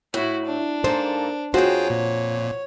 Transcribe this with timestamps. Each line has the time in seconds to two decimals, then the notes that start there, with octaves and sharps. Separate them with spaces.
0.14 A2 E4 F#4
0.45 D4
0.84 G#2 A#3 A4 C5
1.54 F2 G#2 F4 F#4 G#4 C5 C#5 G5
1.90 A#2